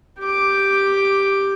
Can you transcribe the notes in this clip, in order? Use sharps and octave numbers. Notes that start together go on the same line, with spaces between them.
G4 D6